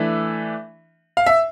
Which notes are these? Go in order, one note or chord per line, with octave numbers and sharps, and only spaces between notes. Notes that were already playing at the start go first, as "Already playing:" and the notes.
Already playing: E3 A3 D4 E5
F5
E5